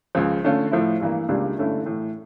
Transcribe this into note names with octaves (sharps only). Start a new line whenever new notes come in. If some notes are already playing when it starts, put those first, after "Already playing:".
C#2 C#3 F3
D3 A3 C#4 F4
A2 F3 A3 E4
G2 E3 A#3
C#2 C#3 G3 A#3 D4
G2 D3 A3 C#4 E4
A2 E3 A3